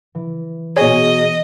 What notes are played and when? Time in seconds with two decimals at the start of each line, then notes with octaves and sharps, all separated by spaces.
0.15 E3
0.76 B2 G#4 C#5 D#5